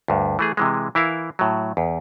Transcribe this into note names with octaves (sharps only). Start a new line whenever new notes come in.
D2 G2
E3 A3 G#4
C3 E3 G#3
E3 E4 A#4 F5
A2 F#3
E2